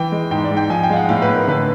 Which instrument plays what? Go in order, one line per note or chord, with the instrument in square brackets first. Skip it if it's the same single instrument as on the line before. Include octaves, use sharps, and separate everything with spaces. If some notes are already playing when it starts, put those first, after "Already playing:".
Already playing: [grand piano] E3 G5
G#3
G#2 G5
D5
G#2
G5
F3 G#5
G5
G#3 F5
F#5
A2 F5
B4
A2
A#4
D3 B4